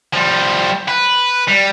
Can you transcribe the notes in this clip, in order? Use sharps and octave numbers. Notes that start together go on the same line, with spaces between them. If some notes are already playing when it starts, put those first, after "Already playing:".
F3 G3
B4
G3